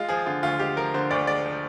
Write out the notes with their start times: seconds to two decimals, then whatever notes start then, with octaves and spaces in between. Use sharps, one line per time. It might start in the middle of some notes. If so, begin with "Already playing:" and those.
Already playing: G#3 F4
0.09 F3 G#4
0.26 D3 F4
0.43 D2 F4
0.59 G#3 G4
0.77 F3 A#4
0.94 D3 C5
1.11 D2 D5
1.27 G#3 D5
1.45 F3